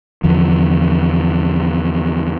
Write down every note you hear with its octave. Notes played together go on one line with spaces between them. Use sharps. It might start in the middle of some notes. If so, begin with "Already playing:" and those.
E2 D3 F3